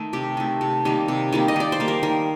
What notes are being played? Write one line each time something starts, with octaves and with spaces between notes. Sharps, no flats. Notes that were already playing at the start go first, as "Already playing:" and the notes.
Already playing: D#3 A3
C3 G4
D#3 A3
C3
D#3 G3 A#3
C3
D#3 G3 A#3
D#5
D#3 D5
C5
G3 A#3
A#4
D#3 A#4